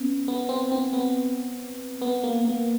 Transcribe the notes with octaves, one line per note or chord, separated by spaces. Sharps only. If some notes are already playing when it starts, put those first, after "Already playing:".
Already playing: B3 C#4
B3
C4
C4
B3
B3
A#3
A#3